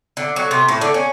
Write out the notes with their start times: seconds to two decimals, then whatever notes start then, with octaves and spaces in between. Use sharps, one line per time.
0.17 D3
0.36 F#3
0.51 C3
0.69 A2
0.81 D3
0.94 C#4